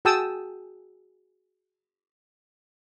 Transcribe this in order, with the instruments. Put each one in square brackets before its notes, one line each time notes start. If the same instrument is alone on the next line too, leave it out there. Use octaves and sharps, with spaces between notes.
[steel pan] F#4 G#4 G5 A5 D#6 E6